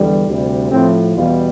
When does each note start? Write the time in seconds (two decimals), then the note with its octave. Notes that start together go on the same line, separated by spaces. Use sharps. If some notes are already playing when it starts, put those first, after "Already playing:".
Already playing: E2 D3 G3
0.27 D2 C3 G3
0.72 A2 F3 C4
1.16 E2 B2 G3 F4